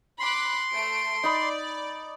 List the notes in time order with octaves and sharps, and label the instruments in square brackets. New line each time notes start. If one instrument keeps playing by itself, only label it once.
[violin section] B5 D6 F#6 [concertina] C6
[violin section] A3 D7
[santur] D#4 B5 [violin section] D5